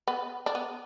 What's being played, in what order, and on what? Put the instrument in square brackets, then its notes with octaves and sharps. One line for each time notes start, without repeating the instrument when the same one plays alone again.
[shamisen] B3
D4
B3